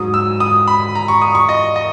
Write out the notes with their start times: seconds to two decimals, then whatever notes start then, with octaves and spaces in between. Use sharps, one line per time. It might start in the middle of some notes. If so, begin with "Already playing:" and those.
Already playing: G#2 F#3 D#6
0.14 E6
0.40 D#6
0.67 B5
0.95 A#5
1.08 C#6
1.22 D#6
1.35 C#6
1.49 D#5
1.76 D#5